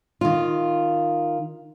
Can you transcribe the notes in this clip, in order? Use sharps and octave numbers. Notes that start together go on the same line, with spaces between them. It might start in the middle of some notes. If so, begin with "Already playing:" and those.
D#3 F4